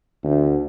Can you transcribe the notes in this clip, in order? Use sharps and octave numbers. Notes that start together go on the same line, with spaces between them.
D2